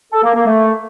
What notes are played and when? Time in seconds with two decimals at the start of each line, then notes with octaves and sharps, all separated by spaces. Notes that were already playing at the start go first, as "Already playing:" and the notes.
0.13 A4
0.24 A#3
0.35 A#3
0.46 A3